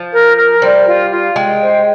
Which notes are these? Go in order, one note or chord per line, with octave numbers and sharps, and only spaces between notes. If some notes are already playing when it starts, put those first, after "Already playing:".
Already playing: F3
A#4
A#4
G3 C5
F4
F4
G#3 G5
C5